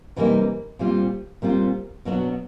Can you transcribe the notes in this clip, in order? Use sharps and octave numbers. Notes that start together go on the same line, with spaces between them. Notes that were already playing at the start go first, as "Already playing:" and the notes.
C3 E3 G3 A#3 D#4
A#2 G3 C4 F4
A#2 G3 C4 F4
B2 F#3 B3 D4 F#4